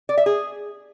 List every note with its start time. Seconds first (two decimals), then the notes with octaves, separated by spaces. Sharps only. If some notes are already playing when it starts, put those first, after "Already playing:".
0.09 D5
0.17 E5
0.26 G#4